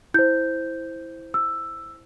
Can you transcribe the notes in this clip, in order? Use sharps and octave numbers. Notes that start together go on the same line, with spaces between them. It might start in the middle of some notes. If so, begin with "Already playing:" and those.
E4 C5 G6
E6